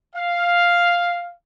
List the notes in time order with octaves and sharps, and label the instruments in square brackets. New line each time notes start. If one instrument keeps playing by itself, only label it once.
[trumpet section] F5